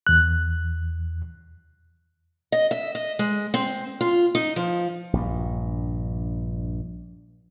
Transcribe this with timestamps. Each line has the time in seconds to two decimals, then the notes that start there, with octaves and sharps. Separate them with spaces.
0.07 E2 F#6
2.52 D#5
2.71 E5
2.95 D#5
3.19 G#3
3.54 C4
4.01 F4
4.35 D#4
4.56 F3
5.13 A#1 G2